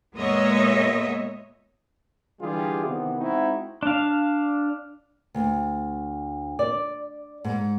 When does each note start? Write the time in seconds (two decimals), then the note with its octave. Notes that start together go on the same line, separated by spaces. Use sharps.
0.15 A#2 G#3 B3 C#5 D#5 E5
2.41 D3 E3 G3 F4 G4 G#4
2.85 C3 D#3 E3 B3
3.18 G#3 C4 D#4 E4 F#4
3.83 D4 F5
5.35 D2
6.59 D5
7.44 G#2